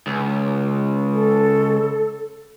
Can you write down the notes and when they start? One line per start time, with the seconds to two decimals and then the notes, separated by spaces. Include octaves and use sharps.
0.07 C#2
1.14 A4